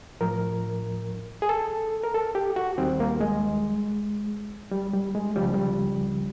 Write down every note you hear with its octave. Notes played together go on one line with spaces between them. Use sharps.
A2 F3 A#4
G#4
A4
A#4
A4
G4
F#4
D#2 D#3 G3 C4
A#3
G#3
G3
G3
G#3
C#2 C#3 F3 G3
G3